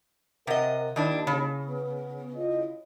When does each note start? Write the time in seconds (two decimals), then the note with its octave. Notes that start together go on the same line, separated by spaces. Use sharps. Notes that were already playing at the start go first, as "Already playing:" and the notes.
0.47 C3 A#4 D#5 E5 F#5
0.96 D#2 D#3 D4 E4
1.27 C#3
1.68 B3
2.36 E4 F4 D#5